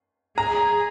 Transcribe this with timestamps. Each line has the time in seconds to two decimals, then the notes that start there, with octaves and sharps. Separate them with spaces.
0.38 G#4 A#5